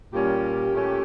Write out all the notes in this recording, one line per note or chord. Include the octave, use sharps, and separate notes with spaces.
A#2 G3 A#3 C#4 G4
A#2 A3 C#4